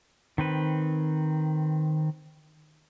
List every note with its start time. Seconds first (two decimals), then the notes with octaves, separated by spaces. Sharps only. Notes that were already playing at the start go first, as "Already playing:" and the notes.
0.38 D#3 C4 B4